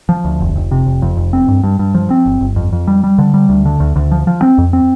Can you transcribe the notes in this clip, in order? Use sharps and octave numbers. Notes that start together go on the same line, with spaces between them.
F3
D2
F1
F1
C3
F1
F2
F1
C4
G2
G2
G2
F3
C4
G1
G1
F2
F2
G3
G3
D3
G3
D2
D3
D2
D2
F3
F3
C4
F2
C4